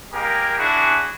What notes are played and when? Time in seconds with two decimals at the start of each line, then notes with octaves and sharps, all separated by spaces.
0.13 G#3 A#3 G4 G#4 A#4
0.58 D4 E4 F#4 G#4 G#5